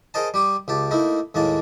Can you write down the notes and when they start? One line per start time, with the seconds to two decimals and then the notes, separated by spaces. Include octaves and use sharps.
0.14 G#4 A#4 C5 D#5 A5
0.34 G3 G4 D6 D#6
0.68 C#2 G4 A5
0.91 A3 A#3 D#4 E4
1.34 D#2 A2 G#3 A#3 A5